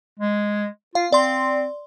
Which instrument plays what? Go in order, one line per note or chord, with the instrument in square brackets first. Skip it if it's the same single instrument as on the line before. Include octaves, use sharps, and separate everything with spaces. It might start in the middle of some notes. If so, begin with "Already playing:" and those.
[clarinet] G#3
[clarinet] F4 [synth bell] F5
[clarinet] C4 [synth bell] D5 C6